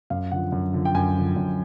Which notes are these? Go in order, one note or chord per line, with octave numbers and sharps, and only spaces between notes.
F#2 F5
D3 F3 F#5
F#2
D3 F3
G5
F#2 G#5
D3 F3
F#2